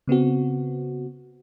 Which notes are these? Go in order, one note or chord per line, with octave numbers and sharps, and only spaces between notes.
C#3 B3 C4 F#4